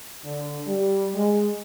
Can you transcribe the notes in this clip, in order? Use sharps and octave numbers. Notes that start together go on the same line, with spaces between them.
D3
G3
G#3